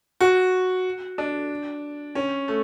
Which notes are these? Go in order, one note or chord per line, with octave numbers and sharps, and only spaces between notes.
F#4
D4
C#4
A3